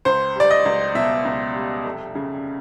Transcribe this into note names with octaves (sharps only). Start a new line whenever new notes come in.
C#2 C5
G3 D5
D#5
C#2
B2 E5
C#2
G3
F1
C#3